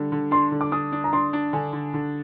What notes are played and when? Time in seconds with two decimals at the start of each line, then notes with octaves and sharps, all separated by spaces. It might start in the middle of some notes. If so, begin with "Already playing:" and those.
Already playing: D3 G3 D4
0.12 D3
0.31 D4 C6
0.51 D3
0.61 D6
0.72 D4 D#6
0.92 D4
1.04 A#5
1.13 D4 C6
1.33 D4
1.53 D3 G#5
1.73 D3
1.94 D3